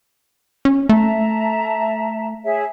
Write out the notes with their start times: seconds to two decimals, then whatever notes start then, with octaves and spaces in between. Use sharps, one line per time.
0.65 C#4
0.89 A3 E5 A5 A#5
2.44 G#4 C#5 E5